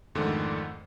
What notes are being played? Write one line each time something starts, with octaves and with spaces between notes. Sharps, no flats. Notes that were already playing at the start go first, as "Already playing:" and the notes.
F2 G#2 D3 D#3 A3